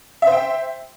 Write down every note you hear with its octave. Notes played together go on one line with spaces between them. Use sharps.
C5 E5 G5